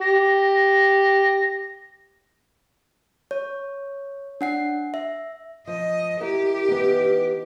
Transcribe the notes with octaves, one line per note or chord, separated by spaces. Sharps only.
G4 A#6
C#5
D4 F#5 C7
E5
F3 D#5
E4 G4 A#4
E3 B3 D#4